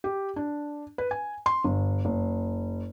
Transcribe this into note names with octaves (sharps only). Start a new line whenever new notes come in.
G4
D4
B4
G#5
C6
G1
F#1